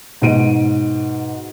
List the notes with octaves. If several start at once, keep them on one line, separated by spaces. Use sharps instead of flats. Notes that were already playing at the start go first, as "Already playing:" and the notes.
G#2 B2 D7 D#7